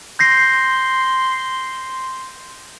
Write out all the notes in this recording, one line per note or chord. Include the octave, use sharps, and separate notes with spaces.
C6 G6 A#6 C7